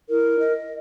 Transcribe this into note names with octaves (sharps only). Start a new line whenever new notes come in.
E4 A#4
D#5